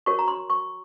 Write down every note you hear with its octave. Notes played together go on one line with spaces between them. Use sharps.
F#4 A#4 C#5 C#6
A#5
C6
C#6